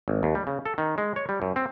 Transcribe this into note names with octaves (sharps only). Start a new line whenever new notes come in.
G#1
D#2
G3
C#3
A4
D#3
G#3
C#5
G3
F#2
C4